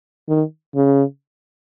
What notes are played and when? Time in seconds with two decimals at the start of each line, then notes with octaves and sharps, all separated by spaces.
0.28 D#3
0.75 C#3